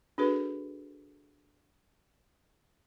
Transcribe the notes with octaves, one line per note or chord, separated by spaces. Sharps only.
D4 F#4 G#4 A4 B4